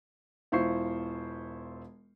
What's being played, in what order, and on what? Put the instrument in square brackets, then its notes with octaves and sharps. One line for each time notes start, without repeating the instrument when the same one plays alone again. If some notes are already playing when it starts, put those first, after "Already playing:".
[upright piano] E1 E4 F4 C5 C#6 C7